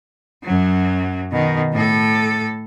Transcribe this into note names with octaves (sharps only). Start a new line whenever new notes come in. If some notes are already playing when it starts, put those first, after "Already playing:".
F#2 F#3
B2 D#3
A2 A4